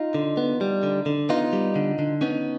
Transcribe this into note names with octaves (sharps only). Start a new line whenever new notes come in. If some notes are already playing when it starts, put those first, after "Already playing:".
Already playing: D#4 F4
D3
B3
G3
D3
D3
B3 D#4 F4
G3
D3
D3
B3 C#4 D#4